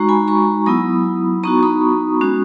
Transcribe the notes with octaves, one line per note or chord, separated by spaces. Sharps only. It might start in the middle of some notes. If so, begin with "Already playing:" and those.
Already playing: G#3 D#4 F#4 A#5 C#6
G#5 B5
A#5 C#6
F#3 B3 E4 B5 D#6
B3 D#4 F#4 A#5 C#6
B5 D#6
G#3 C#4 F#4